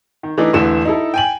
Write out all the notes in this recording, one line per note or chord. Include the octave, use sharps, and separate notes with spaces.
D#3
E3 A3 D4 D#4 D5
E1 D3 E3 A3 E7
D#4 E4 A4
G5 G#5 F#7